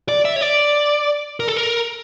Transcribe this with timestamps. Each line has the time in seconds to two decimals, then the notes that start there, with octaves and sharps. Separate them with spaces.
0.09 D5
0.25 E5
0.36 C#5
0.41 D5
1.40 A#4
1.48 A4
1.56 A#4